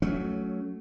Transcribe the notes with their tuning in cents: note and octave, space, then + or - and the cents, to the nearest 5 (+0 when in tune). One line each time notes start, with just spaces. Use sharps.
F#3 +0 A3 +0 C#4 +20